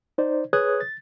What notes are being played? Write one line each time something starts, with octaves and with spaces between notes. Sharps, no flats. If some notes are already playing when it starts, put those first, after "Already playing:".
D#4 C5 D5
G#4 B4 C#5 D#6 F#6 G#6
A6